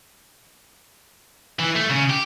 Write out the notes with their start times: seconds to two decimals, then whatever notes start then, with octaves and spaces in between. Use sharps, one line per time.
1.59 E3
1.76 A3
1.90 C#3
2.10 G4